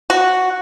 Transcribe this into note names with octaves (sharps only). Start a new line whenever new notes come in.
F#4